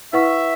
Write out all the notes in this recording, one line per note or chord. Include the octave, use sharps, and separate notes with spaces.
E4 B4 E5 F#5 C#6